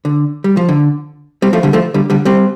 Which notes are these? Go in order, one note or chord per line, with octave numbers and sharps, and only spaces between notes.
D3
G3
F3
D3
G3 C4
F3 A3
D3 G3
F3 A3
D3 G3
D3 G3
G3 C4